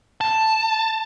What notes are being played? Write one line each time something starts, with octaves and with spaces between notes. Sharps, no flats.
A5